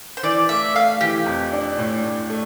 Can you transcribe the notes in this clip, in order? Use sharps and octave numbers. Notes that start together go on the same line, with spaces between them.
C5
E3 D5
A3 E5
A3 F5
E3 G4
F2
D4
A2
A2
A3